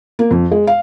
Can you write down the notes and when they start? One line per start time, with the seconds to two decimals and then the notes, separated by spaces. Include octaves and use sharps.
0.19 A#3
0.31 F2
0.52 G#3
0.67 F5